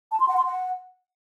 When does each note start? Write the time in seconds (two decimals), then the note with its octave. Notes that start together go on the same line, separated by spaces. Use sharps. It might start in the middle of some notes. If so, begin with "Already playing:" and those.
0.12 A5
0.20 C6
0.29 F#5
0.37 C6
0.45 F#5